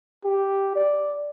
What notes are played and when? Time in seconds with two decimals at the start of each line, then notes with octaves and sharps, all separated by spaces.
0.25 G4
0.76 D5